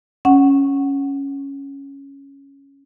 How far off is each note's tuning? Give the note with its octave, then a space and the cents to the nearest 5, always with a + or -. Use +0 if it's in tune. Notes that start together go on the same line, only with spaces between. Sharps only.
C#4 +0 F#5 +0